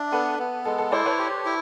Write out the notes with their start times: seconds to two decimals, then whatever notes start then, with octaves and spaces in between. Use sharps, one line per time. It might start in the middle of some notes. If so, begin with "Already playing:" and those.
Already playing: D4 D5 E5
0.12 B3 A4 B4
0.39 B3
0.65 G#3 A4
0.78 A4
0.92 E4 C5 D5
1.06 B4 C#5
1.19 G4
1.45 E4